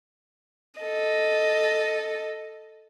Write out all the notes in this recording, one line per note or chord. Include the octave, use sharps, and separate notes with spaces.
A4 D#5